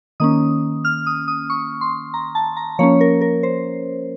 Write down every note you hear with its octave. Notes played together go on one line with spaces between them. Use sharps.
D#3 A#3 C#4 D#6
F6
D#6
D#6
C#6
C6
A#5
A5
A#5
F3 A#3 C#4 C#5
A#4
A#4
C5